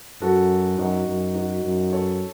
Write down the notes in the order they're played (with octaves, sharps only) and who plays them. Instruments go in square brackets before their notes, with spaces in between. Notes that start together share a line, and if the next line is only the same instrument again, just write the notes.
[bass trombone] F#2 [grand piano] F#4 A4
[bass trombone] F#2 [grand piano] D#4 F#4
[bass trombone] F#2
[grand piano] D#4 F#4
[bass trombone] F#2
[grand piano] A4 C#5